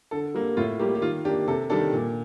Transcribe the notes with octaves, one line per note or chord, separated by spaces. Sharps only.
D3 A4
G3 A#3
A2 F4
G3 A#3 G4
G4
D#3 F4
A#3 D4 G4
C3 A4
D#3 G3 D4 A4
A#2